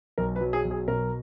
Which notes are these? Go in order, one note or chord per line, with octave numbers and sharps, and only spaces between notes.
B1 A#4
B4
F#3
G#4
B1
G#4
B2 A#4